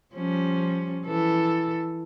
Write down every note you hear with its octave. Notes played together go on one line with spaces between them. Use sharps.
F3 G3 C#4
E3 A4